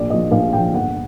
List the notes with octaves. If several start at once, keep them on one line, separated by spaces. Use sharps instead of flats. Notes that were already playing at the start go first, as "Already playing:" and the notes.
Already playing: A#1 D5
A#2 F3 D#5
A#1 F5
A#2 F3 G5
G1 F#5